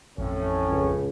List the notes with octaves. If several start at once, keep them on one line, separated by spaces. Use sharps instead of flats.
A1 F2 A2 D#3 C#4
C#2